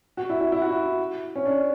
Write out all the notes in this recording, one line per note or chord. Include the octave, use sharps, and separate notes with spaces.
F#4
E4
E4
E4
F#4
E4
C#4
D4